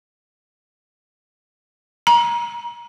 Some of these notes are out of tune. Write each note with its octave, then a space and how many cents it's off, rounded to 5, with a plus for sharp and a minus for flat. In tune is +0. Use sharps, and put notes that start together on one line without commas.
A#5 +30